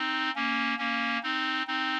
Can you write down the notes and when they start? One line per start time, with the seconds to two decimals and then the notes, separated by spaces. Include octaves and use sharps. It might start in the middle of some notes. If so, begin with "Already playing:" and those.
Already playing: C4 D#4
0.36 A#3 C#4
0.78 A#3 C#4
1.23 C4 D#4
1.67 C4 D#4